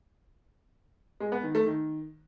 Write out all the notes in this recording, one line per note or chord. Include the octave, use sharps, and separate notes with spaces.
G#3
B3
D#3
A3
D#3